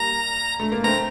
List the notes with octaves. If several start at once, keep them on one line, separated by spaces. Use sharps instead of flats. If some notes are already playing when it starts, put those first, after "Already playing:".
Already playing: G3 A#3 A#5
A3
A#3
A3 C4 A#5